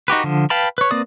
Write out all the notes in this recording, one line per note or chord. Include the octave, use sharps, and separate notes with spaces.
D#4 F#4 G4 B4
D3 F3
B4 F5 G5 A5 B5
B4 C#5
A#3 C4 B4 D5 D#6